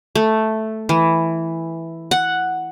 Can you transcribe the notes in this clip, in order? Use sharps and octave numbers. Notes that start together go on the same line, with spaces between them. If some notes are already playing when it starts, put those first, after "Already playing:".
A3
E3
F#5